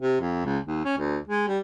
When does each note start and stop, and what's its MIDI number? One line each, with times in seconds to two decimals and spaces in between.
0.01 0.20 48
0.21 0.43 41
0.45 0.59 37
0.66 0.81 39
0.85 0.96 61
0.98 1.18 38
1.28 1.47 56
1.48 1.59 55